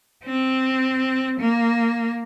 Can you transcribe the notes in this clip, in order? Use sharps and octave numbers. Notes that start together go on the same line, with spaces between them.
C4
A#3